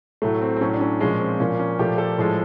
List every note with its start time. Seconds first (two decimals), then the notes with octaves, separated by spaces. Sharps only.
0.22 A2 F#3 A3
0.41 C4
0.56 C4
0.61 A2 F#3 A3 C#4
0.74 D4
0.81 C#4
1.00 A#2 F3 G#3 C#4
1.20 C4
1.40 A#2 F3 A#3 C#4
1.59 C#4
1.79 A#2 F3 A3 G4
1.98 A4
2.18 A2 F3 G#3